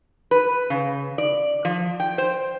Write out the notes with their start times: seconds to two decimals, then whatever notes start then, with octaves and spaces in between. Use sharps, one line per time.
0.31 B4
0.70 C#3
1.18 D5
1.65 F3
2.00 G5
2.18 C5